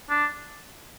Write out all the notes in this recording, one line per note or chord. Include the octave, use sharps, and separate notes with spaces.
D4